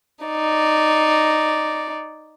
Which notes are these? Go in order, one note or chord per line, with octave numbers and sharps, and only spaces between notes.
D#4 D5